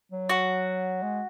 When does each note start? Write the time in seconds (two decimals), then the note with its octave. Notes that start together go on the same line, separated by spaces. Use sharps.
0.12 F#3
0.29 F#4
1.02 G#3